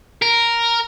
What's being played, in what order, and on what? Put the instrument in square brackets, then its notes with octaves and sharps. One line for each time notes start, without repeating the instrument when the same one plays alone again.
[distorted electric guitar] A#4